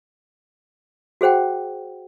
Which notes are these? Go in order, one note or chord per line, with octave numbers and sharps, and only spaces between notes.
F#4 G#4 C5 F#5 G5